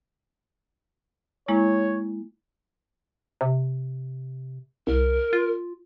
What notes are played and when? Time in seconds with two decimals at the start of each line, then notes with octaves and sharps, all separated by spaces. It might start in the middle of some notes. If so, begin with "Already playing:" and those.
1.48 G#3 A#3 E4 C#5
3.41 C3
4.87 C2 A#4
5.33 F4